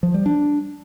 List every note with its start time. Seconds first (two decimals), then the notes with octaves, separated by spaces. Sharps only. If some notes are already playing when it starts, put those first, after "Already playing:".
0.03 F3
0.14 G3
0.26 D4